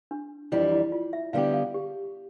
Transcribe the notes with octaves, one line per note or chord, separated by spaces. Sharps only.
D4
F2 E3 G3 D4 E4 G4
E4
F4
E5
D3 G3 B3 E4 G4 F5
F5
G4